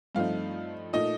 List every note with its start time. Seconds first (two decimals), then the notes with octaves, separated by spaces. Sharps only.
0.15 G2 F3 A3 C4 D#4 F5
0.93 A#2 A3 D#4 D#5